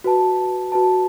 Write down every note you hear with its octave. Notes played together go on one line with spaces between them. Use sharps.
F#4 B4 A5
F#4 B4 A5